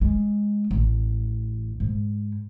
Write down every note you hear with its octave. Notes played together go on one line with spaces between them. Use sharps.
G#3
A1
G#2